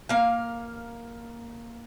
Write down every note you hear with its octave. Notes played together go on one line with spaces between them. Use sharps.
A#3 F5